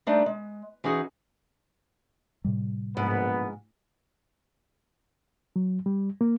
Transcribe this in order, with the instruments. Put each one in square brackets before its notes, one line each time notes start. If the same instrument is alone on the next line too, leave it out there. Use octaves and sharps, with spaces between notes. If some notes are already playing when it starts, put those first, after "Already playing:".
[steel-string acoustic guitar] G3 A3 D4 D#4 B4
G#3
E3 C#4 D#4 F#4 G#4
[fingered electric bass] A2 C3 G3
[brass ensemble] A#1 B3 [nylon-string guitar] G#2
[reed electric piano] F#3
G3
A#3